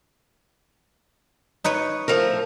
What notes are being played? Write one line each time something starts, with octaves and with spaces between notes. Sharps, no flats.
D#4 B4 C#5
F3 A3 A#4